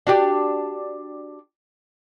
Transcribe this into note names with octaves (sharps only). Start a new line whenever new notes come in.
D4 F#4 G4